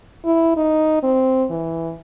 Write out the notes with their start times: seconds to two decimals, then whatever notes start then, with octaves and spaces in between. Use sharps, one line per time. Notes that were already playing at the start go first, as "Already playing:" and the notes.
0.25 E4
0.56 D#4
1.03 C4
1.50 E3